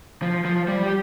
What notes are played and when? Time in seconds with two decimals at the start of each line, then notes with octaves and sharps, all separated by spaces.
0.22 F3
0.45 F3
0.68 G3
0.83 G4